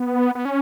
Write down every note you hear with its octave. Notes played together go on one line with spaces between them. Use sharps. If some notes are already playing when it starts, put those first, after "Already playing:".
Already playing: B3
B3
C#4